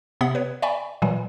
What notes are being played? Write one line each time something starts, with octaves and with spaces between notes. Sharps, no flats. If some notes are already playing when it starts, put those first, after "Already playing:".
C3 B3 F#5 D#6 B6
B4 C#5
D5 E5 G5 G#5 B5 C#6
A#2 E3 F#3 G3